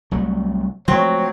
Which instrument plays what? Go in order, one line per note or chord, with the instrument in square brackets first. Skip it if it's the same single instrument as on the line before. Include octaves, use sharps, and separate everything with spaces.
[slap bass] C2 F#3 A3
[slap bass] F3 G#3 A3 [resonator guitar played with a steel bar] F#3 C4 [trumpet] C#5